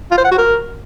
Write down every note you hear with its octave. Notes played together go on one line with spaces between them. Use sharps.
F4
C5
F#5
F#4
A#4